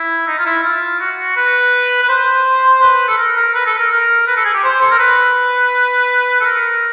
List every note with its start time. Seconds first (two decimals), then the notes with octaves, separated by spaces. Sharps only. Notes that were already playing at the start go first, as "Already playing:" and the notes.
Already playing: E4
0.28 D#4
0.39 F4
0.46 E4
0.64 F4
1.00 F#4
1.36 B4
2.03 B4
2.09 C5
2.82 B4
3.08 A4
3.18 A#4
3.36 A#4
3.55 B4
3.66 A4
3.79 A#4
3.91 A#4
4.27 B4
4.36 A4
4.45 G#4
4.54 G4
4.64 C5
4.81 A4
4.91 A#4
4.99 B4
6.41 A4
6.45 A#4